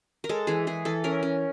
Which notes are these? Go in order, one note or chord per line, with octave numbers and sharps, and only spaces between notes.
A#4
G#3 A4
E3 G#4
E3 G#4
E3 A4
C#4 A#4
C#4